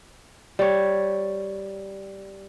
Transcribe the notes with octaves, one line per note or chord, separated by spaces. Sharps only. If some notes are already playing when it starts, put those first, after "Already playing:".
G3 C#5